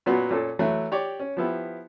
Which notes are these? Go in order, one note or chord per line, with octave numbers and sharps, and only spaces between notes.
A#2 F#3 B3 C#4 F#4
A#2 C#4 A4
E3 F#3 A3
G4 C#5 D5
C#4
F3 B3 E4 G4